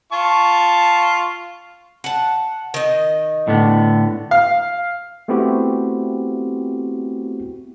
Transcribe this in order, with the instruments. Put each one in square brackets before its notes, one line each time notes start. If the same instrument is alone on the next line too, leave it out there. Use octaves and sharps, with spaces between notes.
[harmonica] F4 A5 C#6
[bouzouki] F#5 A5
D#3 D#5
[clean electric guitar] A2 D3 B3
[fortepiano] F5
[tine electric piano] A3 B3 C4 E4 F#4 G4